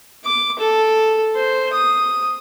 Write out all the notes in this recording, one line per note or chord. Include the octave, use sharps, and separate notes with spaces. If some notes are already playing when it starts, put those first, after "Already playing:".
D6
A4
C5
D#6